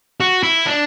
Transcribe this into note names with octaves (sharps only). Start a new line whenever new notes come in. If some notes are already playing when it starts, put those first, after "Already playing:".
F#4
E4
D4